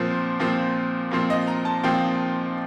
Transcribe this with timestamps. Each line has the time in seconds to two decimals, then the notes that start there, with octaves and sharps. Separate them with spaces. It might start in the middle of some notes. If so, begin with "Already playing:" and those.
Already playing: A#2 F3 C4 C5
0.40 A#2 F3 C4
1.11 A#2 F3 C4
1.30 D#5
1.47 A#5
1.65 A5
1.83 A#2 F3 C4 G5